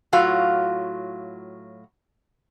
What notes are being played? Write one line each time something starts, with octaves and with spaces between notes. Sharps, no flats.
A2 F#3 F4 F#4 F5